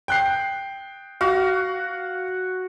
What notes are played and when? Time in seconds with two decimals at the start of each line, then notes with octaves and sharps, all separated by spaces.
0.08 G5 F#6 C7
1.21 F#4 F5